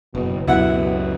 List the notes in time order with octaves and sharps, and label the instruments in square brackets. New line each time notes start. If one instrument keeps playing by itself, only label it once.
[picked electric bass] F#1 [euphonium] B2
[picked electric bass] C#2 F#2 [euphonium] B2 [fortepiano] E4 F#5